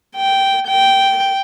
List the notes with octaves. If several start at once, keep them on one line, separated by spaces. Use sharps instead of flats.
G5
G5